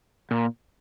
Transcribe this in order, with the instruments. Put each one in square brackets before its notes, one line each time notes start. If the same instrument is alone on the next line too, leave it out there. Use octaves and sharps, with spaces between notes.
[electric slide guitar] A#2